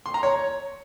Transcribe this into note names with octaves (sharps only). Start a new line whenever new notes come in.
C6
A#5
C#5